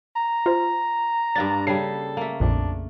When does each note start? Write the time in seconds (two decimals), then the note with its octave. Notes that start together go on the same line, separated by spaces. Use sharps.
0.16 A#5
0.46 F4 C5
1.36 G2 A#3 D4 A6
1.67 C#3 G3 A4 C7
2.17 A3 A#3
2.40 A#1 F2 D4